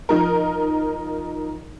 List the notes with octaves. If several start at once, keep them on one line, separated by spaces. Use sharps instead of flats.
F3 D#4 A#4